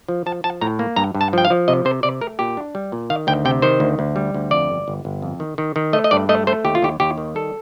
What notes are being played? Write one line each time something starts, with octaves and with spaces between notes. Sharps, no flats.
F3
F3 A5
F3 A5
A2 A#5
A#3
G2 A#5
G2
A5
F3 G5
F5
F3
C3 D#5
C3 C5
C3 D5
A3 A#4
A#2 G4
D4
G3
A#2
D#3 F5
D2 G5
C3 G5
D#3 C5
D2
D2
G3
D2
F2 D5
G1
G1
G1
F2
D#3
D#3
D#3
A3 D#5
D#5
G2 D5
A3 D#5
A3 C5
D#2 G4
F4
D#2 G4
D#2 G4
D#3
G3 A4